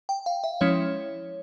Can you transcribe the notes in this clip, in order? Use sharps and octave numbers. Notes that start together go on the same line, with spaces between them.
G5
F5
E5
F3 G#3 C#4 E4 C#5